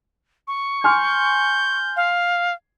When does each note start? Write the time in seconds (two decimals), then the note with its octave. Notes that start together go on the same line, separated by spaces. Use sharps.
0.48 C#6
0.84 G#5 C6 F6 G6
1.96 F5